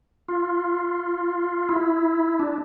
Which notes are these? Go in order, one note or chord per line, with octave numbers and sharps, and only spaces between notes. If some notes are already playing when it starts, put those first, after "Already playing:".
F4
E4
D4